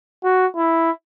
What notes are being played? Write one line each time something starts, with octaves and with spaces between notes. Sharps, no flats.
F#4
E4